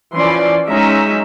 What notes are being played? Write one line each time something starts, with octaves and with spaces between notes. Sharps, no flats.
E3 F3 C#4 D5 C6
F#3 G#3 C#4 D#4 E5 A#5